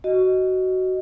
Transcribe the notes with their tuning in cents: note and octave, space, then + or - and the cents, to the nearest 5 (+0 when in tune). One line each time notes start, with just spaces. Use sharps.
F#4 +15 D#5 +0